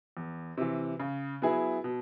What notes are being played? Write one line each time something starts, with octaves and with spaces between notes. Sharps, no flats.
E2
C3 E3
C#3
F#3 B3 E4 G#4
B2